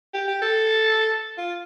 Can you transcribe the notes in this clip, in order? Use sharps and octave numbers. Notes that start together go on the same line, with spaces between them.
G4
G4
A4
F4